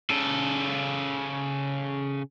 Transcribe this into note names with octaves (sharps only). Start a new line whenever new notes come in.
C#3 A4